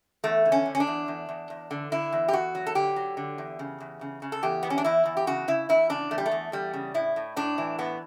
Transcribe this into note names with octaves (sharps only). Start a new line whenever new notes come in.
E2 A3
D3
C#4
D3
C#4
D4
E2
E2
E2
E2
D3
D3 E4
E2
G4
E2 F#4
F#3
A4
D3 G4
F#3
D3
E2
C#3
E2
C#3
C#3
A4
E2 G4
E3 B3
C#4
D4
E2 E4
E2
G4
C#3 F#4
C#3 E4
E2 E4
C#3 D4
E2 A3
G3
A3
E2
E2 G3
C#3
A2 E4
A2
A2 D4
E3
A2 B3